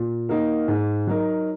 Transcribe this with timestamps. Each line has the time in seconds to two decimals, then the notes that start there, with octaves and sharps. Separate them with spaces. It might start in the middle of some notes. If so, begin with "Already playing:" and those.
Already playing: A#2
0.29 A#3 D#4 F#4 A#4
0.68 G#2
1.07 F#3 D#4 A#4